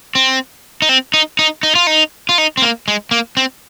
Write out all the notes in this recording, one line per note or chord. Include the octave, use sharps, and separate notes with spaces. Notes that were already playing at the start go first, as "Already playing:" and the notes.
C4
D#4
C4
D#4
D#4
D#4
F4
D#4
F4
D#4
C4
A#3
G#3
A#3
C4